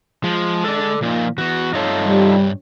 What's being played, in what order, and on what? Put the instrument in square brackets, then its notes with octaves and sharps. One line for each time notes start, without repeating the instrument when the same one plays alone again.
[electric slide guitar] F3 [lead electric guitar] G#3
[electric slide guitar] A4 D5
[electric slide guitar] A#2 [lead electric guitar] F3 D#4
[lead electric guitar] E3 B3 [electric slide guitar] F#4
[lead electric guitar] G2 C#5 [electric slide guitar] D#4 F4 A4
[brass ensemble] G3